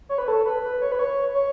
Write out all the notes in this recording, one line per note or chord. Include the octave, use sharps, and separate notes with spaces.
C#5
B4
A4
B4
B4
C#5
B4
C#5
C#5